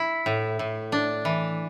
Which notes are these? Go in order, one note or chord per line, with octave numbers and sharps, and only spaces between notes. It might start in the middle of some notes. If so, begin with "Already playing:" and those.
Already playing: E4
A2
A2
D4
E3